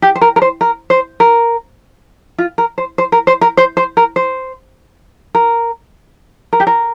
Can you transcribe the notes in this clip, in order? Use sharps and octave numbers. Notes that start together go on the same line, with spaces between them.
G4
C5
A#4
A#4
C5
A#4
C5
A#4
F4
A#4
C5
C5
A#4
C5
A#4
C5
C5
A#4
C5
A#4
A#4
G4
A#4